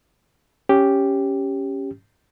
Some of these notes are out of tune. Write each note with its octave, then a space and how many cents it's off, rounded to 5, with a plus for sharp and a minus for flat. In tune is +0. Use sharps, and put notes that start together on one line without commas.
C#4 +0 G4 +0